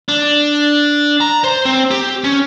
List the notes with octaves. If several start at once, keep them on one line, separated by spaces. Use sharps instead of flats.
D4
A#5
C5
C4
G4
C#4